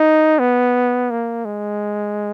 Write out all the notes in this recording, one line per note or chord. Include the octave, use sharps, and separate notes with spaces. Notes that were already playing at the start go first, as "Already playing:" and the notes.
Already playing: D#4
B3
A#3
G#3